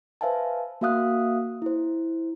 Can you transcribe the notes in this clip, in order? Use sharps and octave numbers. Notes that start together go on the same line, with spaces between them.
B4 C5 E5 F5 G#5 A5
A#3 F#4 E5 F5 D#6 F#6
E4 C5